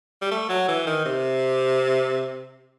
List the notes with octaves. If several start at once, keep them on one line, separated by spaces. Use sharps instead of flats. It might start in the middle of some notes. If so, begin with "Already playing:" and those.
G3
A3
F#3
E3
D#3
C3